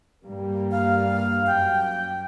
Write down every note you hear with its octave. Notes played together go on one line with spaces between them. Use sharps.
G2 G3 A#3
F5
F#2 G5